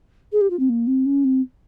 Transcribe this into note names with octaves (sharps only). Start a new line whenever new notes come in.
G#4
G4
F4
C4
A#3
C4
C#4
C4